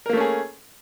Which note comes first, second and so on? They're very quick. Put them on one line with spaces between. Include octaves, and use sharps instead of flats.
A#4 A#3 A3 C#4 G#4